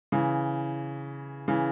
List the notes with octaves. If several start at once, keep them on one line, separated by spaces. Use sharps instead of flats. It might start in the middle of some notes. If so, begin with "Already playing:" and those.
C#3 E3
C#3 E3